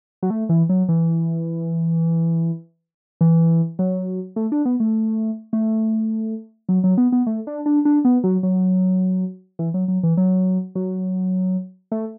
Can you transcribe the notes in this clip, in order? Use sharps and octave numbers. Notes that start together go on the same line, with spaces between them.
F#3
A3
E3
F#3
E3
E3
F#3
A3
D4
B3
A3
A3
F#3
F#3
B3
B3
A3
D4
D4
D4
B3
F#3
F#3
E3
F#3
F#3
E3
F#3
F#3
A3